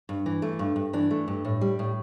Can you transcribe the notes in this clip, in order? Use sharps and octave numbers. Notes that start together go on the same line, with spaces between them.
G2
E3
A3
G2
G2
E3 D4
A3
G2
A2
G3
A2